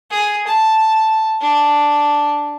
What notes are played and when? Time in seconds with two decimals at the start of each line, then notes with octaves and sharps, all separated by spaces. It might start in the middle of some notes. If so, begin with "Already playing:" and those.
0.11 G#4
0.47 A5
1.41 D4